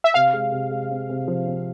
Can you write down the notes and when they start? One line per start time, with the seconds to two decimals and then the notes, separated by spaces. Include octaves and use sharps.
0.04 E5
0.14 C3 F5
0.33 G#3
0.52 C3
0.71 G#3
0.90 C4
1.09 C3
1.28 F3
1.47 C4